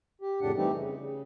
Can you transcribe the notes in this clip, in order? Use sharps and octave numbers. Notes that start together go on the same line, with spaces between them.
G4
F2 A2 C#3 D4 G4 F#5
E3 G3 A3 C4 D#4 G4
C#3
C#3